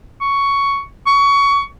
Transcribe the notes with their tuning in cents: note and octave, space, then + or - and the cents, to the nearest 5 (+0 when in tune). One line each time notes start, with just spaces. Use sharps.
C#6 +10
C#6 +20